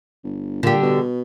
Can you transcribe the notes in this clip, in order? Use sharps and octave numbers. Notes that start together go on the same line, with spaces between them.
G1
A#2 D3 G4
B2